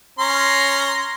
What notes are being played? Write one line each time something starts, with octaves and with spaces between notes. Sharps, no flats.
C#4 A#5 C6